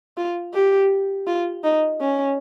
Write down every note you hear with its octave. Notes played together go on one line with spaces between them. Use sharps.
F4
G4
F4
D#4
C#4